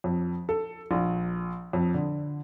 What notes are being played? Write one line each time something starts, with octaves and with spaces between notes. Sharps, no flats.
F2
A4
A#1
F2
D3